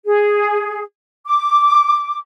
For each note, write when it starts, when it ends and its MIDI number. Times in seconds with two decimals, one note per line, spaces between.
0.05 0.84 68
1.26 2.18 86